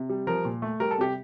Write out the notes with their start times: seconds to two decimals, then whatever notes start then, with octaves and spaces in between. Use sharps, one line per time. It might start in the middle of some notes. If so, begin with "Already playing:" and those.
Already playing: C3
0.09 G3
0.27 F3 A#4
0.45 A#2
0.62 A3
0.80 G3 A#4
0.91 A4
0.98 C3 G4